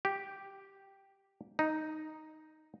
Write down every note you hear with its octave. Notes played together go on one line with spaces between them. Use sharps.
G4
D#4